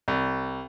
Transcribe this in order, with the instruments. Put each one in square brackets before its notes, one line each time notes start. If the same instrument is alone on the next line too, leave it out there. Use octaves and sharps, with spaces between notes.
[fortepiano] C2